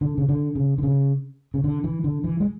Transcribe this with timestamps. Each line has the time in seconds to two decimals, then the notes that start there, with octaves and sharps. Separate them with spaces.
0.01 D3
0.18 C#3
0.29 D3
0.55 C#3
0.78 D3
0.83 C#3
1.54 C#3
1.64 D3
1.84 E3
2.04 D3
2.24 E3
2.40 G#3